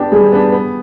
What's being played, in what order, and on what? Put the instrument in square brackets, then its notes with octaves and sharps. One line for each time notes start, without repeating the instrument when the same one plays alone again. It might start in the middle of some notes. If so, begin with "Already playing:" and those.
Already playing: [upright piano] B3 D4 [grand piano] G4
[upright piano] G3 [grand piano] G#4
[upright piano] B3 D4
B3